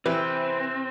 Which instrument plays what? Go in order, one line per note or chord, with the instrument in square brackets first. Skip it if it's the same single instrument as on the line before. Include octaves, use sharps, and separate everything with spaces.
[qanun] C3 G5 D6 [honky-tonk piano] E3 [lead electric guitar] C4 [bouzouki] B4